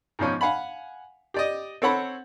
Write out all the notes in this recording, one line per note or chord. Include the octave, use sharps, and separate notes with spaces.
G#2 B2 F3 C#4
F5 F#5 G#5 B5
G4 D5 D#5
C4 A4 C#5 F#5 B5